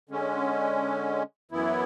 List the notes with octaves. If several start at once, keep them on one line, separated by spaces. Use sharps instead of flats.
D3 G#3 C#4
F#2 E3 B3 E4